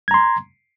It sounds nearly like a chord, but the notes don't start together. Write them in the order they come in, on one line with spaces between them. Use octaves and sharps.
G#6 A#5 C6